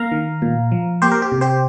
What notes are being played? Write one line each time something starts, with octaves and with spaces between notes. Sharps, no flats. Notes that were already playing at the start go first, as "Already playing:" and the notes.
Already playing: A#3 F5 A#5
D#3
A#2
F3
A#3 G4 C5
A#4
G4
C3
G4 C5